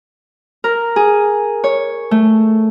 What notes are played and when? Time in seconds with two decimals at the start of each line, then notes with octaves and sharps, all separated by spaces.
0.64 A#4
0.96 G#4
1.64 C#5
2.11 A3